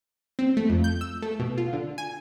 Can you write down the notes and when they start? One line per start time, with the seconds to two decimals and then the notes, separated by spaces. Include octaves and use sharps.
0.39 C4
0.57 A3
0.70 F2
0.84 G6
1.01 E6
1.22 A3
1.39 B2
1.58 F4
1.73 D3
1.98 G#5